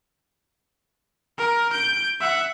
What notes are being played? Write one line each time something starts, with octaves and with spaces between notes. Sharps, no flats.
A#4
G6 D7
E5 F#5